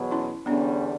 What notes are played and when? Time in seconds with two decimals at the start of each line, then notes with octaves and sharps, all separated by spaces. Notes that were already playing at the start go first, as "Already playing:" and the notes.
Already playing: E2 B2 F#3
0.11 C#4 E4
0.46 E2 D3 G3 B3 C#4 D4